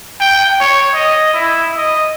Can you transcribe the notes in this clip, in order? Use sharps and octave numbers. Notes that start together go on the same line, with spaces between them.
G5
C#5
D#5
E4
D#5